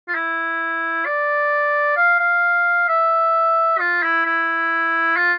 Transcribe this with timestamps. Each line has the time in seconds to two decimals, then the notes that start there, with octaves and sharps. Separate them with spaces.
0.08 F4
0.14 E4
1.06 D5
1.96 F5
2.20 F5
2.88 E5
3.79 F4
4.02 E4
4.25 E4
5.16 F4